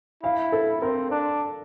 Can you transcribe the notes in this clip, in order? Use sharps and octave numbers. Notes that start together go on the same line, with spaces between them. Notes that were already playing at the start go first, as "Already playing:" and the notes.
E4 F5
A4
C4 A#4
D4